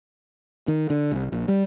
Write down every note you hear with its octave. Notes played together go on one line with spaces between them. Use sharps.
D#3
D3
C2
A#1
G3